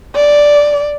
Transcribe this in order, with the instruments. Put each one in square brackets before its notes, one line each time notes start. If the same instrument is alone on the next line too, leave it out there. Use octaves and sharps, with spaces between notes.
[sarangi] D5